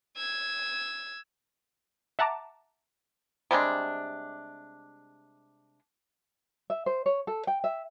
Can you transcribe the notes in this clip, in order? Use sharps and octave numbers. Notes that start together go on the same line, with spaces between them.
E6 G#6
E5 F#5 A5 A#5 D6
C3 G3 G#3 D4
E5
C5
C#5
A4
G5
E5